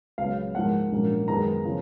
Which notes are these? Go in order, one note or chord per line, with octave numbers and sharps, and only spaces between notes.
C#2 C#3 F#3 B3 F5
G#2 F3 A#3 F#5
A#1 G#2 F#3 A#3 C#4
F#2 D#3 G#3 B3 A#5
C#3 F3